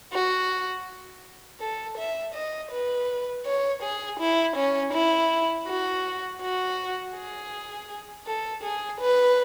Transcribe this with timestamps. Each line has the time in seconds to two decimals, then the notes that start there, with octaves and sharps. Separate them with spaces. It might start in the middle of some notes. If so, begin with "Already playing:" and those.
0.13 F#4
1.60 A4
1.97 E5
2.35 D#5
2.71 B4
3.46 C#5
3.83 G#4
4.20 E4
4.56 C#4
4.93 E4
5.67 F#4
6.41 F#4
7.15 G#4
8.26 A4
8.63 G#4
9.00 B4